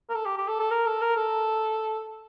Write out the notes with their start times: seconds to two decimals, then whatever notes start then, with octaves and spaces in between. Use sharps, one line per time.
0.09 A#4
0.15 A4
0.25 G4
0.37 G4
0.48 A4
0.60 A4
0.71 A#4
0.86 A4
1.01 A#4
1.16 A4